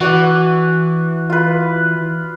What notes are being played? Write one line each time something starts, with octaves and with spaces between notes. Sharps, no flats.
E3 F#4 D5 F#5
F4 B4